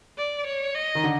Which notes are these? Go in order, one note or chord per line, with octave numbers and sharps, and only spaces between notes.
D5
C#5
D#5
D#3
D3